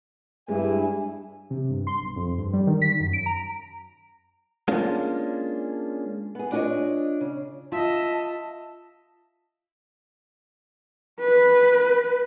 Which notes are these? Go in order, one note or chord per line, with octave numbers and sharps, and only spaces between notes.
G2 G#3 E4 G#5
C3
G2
C6
B1
F2
G2
G3
D#3
B6
F#2
D7
A#5
G#3 A#3 C#4 D4 F4
B3 G#4
D4 F4 G4 B4 C#5 D#5
C#3
F4 D#5 E5 A5
B4